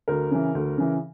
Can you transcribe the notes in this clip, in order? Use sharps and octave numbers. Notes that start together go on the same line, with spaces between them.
D2 A#4
C#3 E3
D2
C#3 E3